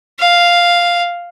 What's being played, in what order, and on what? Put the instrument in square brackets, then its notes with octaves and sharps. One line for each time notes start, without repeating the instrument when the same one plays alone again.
[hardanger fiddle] F5